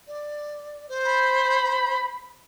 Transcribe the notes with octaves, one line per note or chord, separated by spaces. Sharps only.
D5
C5
B5